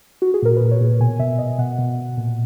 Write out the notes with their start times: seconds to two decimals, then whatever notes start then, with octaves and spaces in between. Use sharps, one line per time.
0.22 F#4
0.34 G#4
0.42 A#2 A#4
0.57 A#2 B4
0.71 C#5
0.81 A#2
1.00 B2 G#5
1.19 B2 E5
1.39 B2 D#5
1.58 B2 F#5
1.79 B2
1.97 B2
2.17 A#2